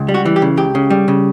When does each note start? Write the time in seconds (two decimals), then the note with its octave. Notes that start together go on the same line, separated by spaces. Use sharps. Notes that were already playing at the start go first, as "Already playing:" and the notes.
Already playing: C#2
0.08 G3
0.14 F#4
0.25 E3
0.36 G4
0.42 C#3
0.57 C#2 G4
0.75 C#3
0.90 G3
1.08 C#3